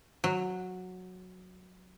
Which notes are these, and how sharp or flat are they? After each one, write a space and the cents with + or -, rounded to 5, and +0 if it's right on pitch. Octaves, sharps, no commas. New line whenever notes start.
F#3 -10